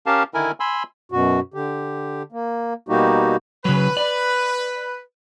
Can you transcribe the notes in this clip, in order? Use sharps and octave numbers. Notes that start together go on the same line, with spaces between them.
C#4 G4 A#4 F5 A5
D3 D#3 E4 A#4 G#5
G#5 B5 C6 E6
F#2 B2 F#4
D3 G4
A#3
B2 G3 A#3 D#4 F#4 G4
C#3 F#3 B4
D5